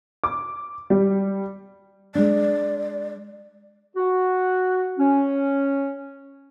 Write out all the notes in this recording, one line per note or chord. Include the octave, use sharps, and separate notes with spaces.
D6
G3
G#3 D4 D5
F#4
C#4